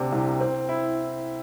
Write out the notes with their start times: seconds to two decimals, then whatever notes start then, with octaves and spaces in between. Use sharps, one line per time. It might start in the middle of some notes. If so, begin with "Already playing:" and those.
Already playing: D2 C3 D4
0.12 C2
0.40 C4
0.69 E4